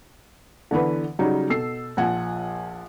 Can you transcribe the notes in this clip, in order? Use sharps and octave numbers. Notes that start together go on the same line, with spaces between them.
D3 E3 B3 B4
C#3 F#3 G3 D#4
B2 A4 E6 C7
A#1 F3 F#5 G#5